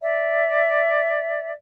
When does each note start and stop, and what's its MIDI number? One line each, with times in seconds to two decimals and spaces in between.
0.01 1.50 74
0.01 1.50 76